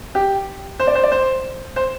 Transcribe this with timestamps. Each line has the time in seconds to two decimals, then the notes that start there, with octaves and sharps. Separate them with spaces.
0.15 G4
0.80 C5
0.87 D5
0.95 C5
1.03 D5
1.12 C5
1.76 C5